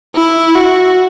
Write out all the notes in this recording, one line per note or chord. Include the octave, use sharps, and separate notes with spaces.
E4
F#4